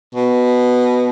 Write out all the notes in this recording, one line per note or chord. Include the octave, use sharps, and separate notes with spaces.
B2